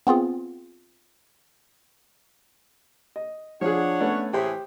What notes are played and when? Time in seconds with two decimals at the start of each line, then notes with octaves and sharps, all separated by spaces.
0.07 B3 C4 F4 G#4
3.16 D#5
3.61 F3 D4 G#4 C#5 F#5
4.00 A3 B3 C#4
4.33 A2 E3 G4 G#4 C5